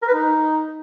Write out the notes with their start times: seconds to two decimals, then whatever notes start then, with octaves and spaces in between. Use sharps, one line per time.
0.02 A#4
0.08 B4
0.13 D#4